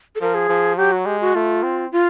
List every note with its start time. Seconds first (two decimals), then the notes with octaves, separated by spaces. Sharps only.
0.15 A4
0.21 F3 A#4
0.34 G#4
0.49 F3
0.77 F#3 G4
0.92 F#4
1.06 G#3 G4
1.21 F#4
1.35 A3 F4
1.63 C4
1.92 F4